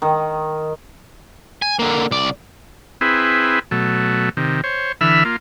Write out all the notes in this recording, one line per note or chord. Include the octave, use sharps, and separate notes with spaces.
D#3
G#5
D3 A#3
C2 D5
C4 E4 G#4 B4
B2 F#3 A3
C3 D#3
C5 C#5
D3 E3 E5 B5 E6 F6
A#3 F4